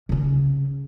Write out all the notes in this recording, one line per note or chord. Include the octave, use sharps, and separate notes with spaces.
C#3 C#4